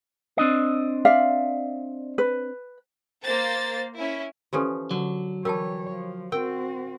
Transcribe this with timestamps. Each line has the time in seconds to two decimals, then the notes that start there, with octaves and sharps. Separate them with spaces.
0.38 C4 D4 D#5
1.05 D5 E5 F5
2.18 B4
3.23 A#3 C5 A6
3.96 C#4 E4
4.53 E3 F3 C#4 G4 A4
4.91 D3 F#3
5.45 E3 G3 A#4 C#5 G5 A5
5.91 F3
6.32 C4 F#4 A#4 G5